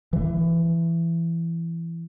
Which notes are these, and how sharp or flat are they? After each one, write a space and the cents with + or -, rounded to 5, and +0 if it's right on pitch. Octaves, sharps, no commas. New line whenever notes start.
E3 +20